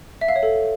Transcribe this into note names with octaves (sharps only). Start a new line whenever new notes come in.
E5
F5
C#5
A4